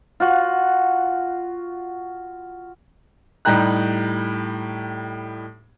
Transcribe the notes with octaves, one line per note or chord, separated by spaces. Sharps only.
F4 F#4 F#5
A2 G3 D#4 G4 A#5 F#6